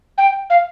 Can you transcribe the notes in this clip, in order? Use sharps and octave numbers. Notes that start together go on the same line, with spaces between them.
G5
F5